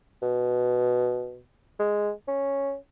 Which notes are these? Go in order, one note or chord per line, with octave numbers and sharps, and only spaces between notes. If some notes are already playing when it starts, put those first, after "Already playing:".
B2
G#3
C#4